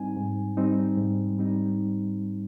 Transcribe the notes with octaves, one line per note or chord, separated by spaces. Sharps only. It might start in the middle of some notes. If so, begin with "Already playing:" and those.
Already playing: G#2 G3 C4 D#4 G#5
G#2
G3 C4 D#4
G#2
G3 C4 D#4